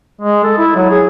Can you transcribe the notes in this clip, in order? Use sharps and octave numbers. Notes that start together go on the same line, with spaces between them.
G#3
A4
E4
F#3
G#4